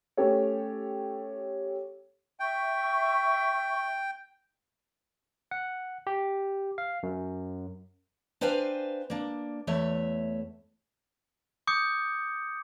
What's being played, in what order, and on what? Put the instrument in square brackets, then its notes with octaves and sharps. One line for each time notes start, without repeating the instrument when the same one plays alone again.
[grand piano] A3 C#4 G4 A4 C#5
[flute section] E5 C#6 [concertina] G5
[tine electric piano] F#5
G4
F5
F#2
[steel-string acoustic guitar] D4 B4 C5 F5 G5 G#5
A#3 D4
E2 A3 C#5 E5
[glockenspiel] D6 D#6 G6 C#7